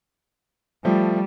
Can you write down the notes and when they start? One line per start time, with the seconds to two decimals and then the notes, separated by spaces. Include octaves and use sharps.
0.85 F3 G3 A3